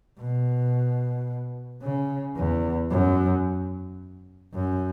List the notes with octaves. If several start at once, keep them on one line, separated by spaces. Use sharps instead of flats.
B2
C#3
E2
F#2
F#2